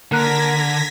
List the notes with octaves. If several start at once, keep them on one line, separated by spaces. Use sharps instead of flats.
D3 A#3 A#4 F#6 G#6 A#6 B6